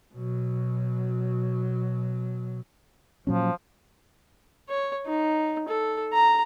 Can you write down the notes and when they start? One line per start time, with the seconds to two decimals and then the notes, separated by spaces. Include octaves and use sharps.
0.14 B2 F#3
3.27 A#2 F3 F#3 C#4
4.69 C#5
5.06 D#4
5.68 A4
6.14 A#5